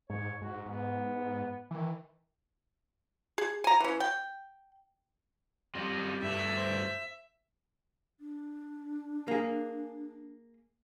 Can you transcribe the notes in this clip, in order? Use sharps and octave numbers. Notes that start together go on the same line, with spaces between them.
G#2 C#5
G#2 F#4
G#2 B3
D#3 E3
G#4
G#5 A#5
E3 C#4
G5
G3 C4 F4 D#5
G2 A3 E5
C5
D4
A#3 G#4